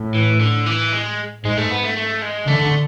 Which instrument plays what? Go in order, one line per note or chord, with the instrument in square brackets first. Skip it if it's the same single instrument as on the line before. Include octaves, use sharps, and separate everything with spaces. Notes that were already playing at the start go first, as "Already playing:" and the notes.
Already playing: [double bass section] A2
[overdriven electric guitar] E3
D3
E3
G#3
[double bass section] G#2 [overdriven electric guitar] G#3
[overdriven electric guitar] A3
B3
A3
A3
G#3
[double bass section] D3 [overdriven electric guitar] A3